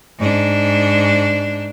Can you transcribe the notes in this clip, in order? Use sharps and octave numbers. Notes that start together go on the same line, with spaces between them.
G#2 D4